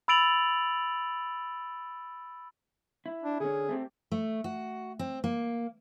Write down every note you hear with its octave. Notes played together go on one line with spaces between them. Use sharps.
B5 E6 A6 D7 F7 F#7
E4
D4
D3 C#4 G#4
A3 C4 G4
A3
F#4
C4
A#3